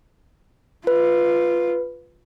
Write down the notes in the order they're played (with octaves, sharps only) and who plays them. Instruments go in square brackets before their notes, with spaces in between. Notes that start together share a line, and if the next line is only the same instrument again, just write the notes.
[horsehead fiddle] F4 [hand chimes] B4